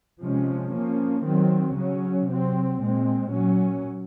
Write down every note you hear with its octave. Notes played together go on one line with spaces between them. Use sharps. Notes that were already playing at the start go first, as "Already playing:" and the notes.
C3 F3 G#3 C#4
F3 A#3 C#4
D#3 F#3 C4
C#3 F#3 C#4
C3 F#3 C4
A#2 G#3 C4
A#2 F#3 C#4